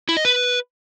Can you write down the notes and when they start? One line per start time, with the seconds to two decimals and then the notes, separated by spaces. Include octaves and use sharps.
0.09 E4
0.17 D#5
0.25 B4